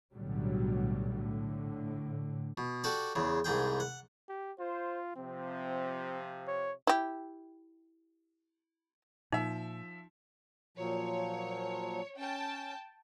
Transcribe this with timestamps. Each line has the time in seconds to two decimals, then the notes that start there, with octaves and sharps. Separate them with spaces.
0.13 B1 A2 D3 F#3 G3
1.16 A2 D3
2.58 B2
2.84 F#4 G4 A4 D5
3.15 E2 C#3
3.44 C2 G#2 G#4 G5
3.80 F#5
4.29 G4
4.59 F4 C5
5.16 C3 F3 C4
6.47 C#5
6.87 E4 G4
9.32 A#2 F3 D#4 E5
10.77 A#2 F3 F#3 C#5
12.18 C#4 G5 A5